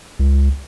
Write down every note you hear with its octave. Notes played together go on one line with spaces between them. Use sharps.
C#2